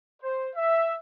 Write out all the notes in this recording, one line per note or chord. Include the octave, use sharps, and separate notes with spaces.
C5
E5